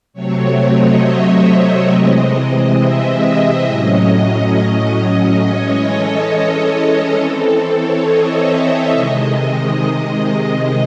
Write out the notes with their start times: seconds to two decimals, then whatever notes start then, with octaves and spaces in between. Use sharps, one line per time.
0.13 C3 F#3 A3 C4 C#5
0.42 C#5
0.71 D#5
1.01 E5
1.44 D#5
1.89 C3 E3 G#3 C4
2.76 E5
3.21 D#5
3.65 A2 F#3 C#4
5.40 E3 G#3 C#4 C#5
5.84 A4
7.16 E3 C4 A4
7.45 A4
7.75 C#5
8.04 D#5
8.34 E5
8.63 D#5
8.92 C3 D#3 G#3